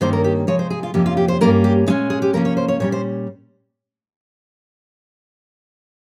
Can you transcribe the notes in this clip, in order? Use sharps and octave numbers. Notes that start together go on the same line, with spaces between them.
G2 D#3 A#3 C#4 C5
A#4
G4
C3 F3 G#3 C#5
C5
G#4
F4
F2 C3 F3 A#3 C#4 G4
F4
G4
C5
G2 G3 A#3 C#4 A#4
G4
A#2 G#3 C#4 D#4
G#4
G4
C3 F3 A#3 C#4 A#4
C#5
C5
C#5
A#2 G3 C#4 C#5
C5